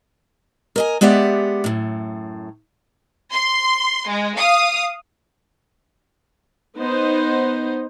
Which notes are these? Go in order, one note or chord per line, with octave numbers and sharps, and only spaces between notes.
A#4 D#5 G#5
G#3 B3 G4 D5 E5 F#5
F#2 A2
C6
G#3
F5 D#6
B3 D#4 C5